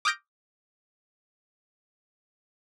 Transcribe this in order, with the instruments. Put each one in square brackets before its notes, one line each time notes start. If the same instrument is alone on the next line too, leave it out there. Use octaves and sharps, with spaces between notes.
[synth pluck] D6 D#6 F6 G6 A#6 D7